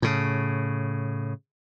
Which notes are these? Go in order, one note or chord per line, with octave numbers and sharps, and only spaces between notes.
A2 C#3